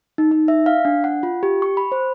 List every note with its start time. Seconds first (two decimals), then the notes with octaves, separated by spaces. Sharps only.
0.18 D#4
0.32 D#4
0.48 E5
0.66 F5
0.85 D4
1.04 F#5
1.23 F4
1.43 G4
1.62 C#6
1.77 B5
1.92 C5